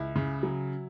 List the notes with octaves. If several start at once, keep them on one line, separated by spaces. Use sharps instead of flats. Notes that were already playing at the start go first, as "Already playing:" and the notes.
Already playing: C#2 E4
C#3
F#3